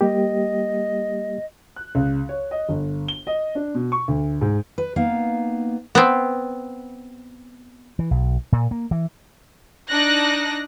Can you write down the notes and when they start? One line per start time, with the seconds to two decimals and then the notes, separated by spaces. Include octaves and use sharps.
0.01 G3 A#3 G4 D#5
1.76 F#6
1.95 C#2
2.29 C#5
2.51 D#5
2.69 G1
3.08 G7
3.27 D#5
3.55 D4
3.75 B2
3.92 C#6
4.08 D2
4.41 G#2
4.78 B4
4.96 A#3 B3 D#4 F5
5.95 B3 C4
7.99 E3
8.11 B1
8.52 A#2
8.71 A#3
8.91 E3
9.88 D4 D#4 F#6 A#6